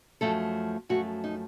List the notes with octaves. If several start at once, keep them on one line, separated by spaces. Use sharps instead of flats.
F#2 F3 A3 A4
F#2 F3 A3 F#4
D#4